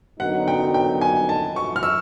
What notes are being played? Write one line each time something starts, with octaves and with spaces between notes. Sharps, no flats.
F#2 D3 F#3 B3 D#4 F#5
G5
G5
G#5
A5
C#6
F6
E6